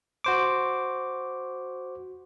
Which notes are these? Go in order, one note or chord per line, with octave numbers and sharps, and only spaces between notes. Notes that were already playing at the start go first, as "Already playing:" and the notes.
F#4 C5 D6